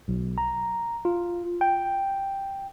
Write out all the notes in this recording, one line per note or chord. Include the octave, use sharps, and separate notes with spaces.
B1
A#5
F4
G5